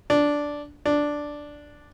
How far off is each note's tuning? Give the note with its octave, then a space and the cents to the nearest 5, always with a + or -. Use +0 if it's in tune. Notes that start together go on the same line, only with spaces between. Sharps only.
D4 -5
D4 +0